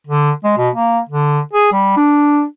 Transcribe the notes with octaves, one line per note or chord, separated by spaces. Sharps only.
D3
G#3
B2
A#3
D3
G#4
G3
D4